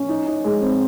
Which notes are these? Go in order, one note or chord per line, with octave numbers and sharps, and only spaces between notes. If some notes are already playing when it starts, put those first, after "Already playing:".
Already playing: C#4
D#4
D#4
G#3
C4